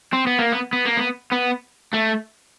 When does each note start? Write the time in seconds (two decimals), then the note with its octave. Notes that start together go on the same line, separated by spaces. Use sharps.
0.13 C4
0.27 B3
0.39 A#3
0.52 B3
0.73 B3
0.85 A#3
0.97 B3
1.32 B3
1.93 A3